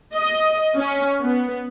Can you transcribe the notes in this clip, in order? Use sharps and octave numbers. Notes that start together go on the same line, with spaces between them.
D#5
C#4
B3